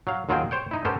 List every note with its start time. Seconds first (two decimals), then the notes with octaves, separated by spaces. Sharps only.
0.07 F#3 F5
0.29 D#2 F#3 F4 F#4 G#4 G5
0.51 C5 C#5 G5
0.71 D#4 E4
0.85 B3 C#4 G4 A4 A#4 C5